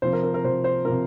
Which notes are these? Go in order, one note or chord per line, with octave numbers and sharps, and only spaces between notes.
C3 F3 C5
A#4
A#4
A#4
C3 F3 C5
C5
C3 F3 A#4